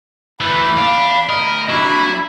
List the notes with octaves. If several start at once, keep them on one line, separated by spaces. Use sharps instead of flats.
E3 A3 D4 B5
E2 D4 F5
D2 A#4 D#5
F#3 D4 E4 B5